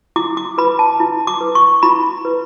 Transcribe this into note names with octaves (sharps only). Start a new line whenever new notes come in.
E4 D6
D6
B4 B5
A5
E4
D6
B4
C#6
E4 B5
B4